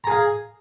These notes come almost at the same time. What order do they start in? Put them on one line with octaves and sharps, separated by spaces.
A#5 G#4 F5